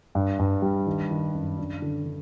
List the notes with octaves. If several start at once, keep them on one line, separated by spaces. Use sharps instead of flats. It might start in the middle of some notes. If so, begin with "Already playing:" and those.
G2
G2
G3
D#3
D#3
F#2
D4
D3
D3